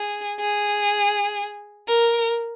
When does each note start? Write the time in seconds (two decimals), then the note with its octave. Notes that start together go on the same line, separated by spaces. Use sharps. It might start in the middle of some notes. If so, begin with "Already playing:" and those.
Already playing: G#4
0.40 G#4
1.88 A#4